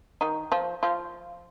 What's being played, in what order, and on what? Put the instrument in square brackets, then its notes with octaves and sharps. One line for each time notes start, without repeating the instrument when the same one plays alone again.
[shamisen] D#3 D#4
F3 F4
F3 F4